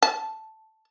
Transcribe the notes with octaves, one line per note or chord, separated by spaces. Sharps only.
A5